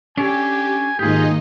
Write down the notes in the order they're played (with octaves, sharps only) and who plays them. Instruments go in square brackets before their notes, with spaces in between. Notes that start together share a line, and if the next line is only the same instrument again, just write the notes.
[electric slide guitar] C#4 D4 A4 [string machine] G4 [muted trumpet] G#5
[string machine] G#2 D#4 D#5 [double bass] D#3 A#3 [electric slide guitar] F4 G4 [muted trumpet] G#4